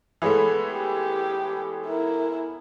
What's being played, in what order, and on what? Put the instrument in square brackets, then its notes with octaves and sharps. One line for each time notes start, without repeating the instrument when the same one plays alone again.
[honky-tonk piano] E3 G#3 A3 [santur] B3 C#5
[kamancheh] G4
E4 A#4